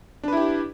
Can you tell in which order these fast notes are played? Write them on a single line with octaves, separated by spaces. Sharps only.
D4 B4 E4 G4